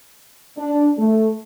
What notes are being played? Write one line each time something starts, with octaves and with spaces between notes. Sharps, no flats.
D4
A3